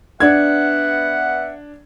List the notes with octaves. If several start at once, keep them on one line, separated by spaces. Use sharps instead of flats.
B3 D4 E5 F#5 G#6